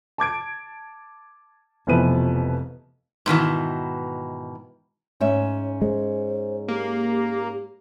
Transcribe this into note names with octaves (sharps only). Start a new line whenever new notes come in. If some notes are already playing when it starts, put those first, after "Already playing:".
A5 D6 G#6 D7
F1 B2 E3 F3 B4 D#7
G#2 B2 D#3 E3
G#2 C#4 C#5 E5
C#5
G#3 C5
A#3 G4